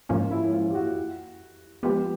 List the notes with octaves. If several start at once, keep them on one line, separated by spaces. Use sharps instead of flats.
G#2 F3 A#3 C#4 F4
E4
F4
G4
F#4
F3 G#3 B3 G4